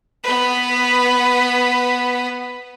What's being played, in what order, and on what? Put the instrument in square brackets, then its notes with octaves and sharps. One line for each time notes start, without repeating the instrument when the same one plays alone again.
[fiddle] B3 B4